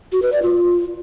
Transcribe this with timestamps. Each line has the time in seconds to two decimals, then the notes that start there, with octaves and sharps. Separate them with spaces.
0.12 F#4
0.22 B4
0.32 D5
0.42 F4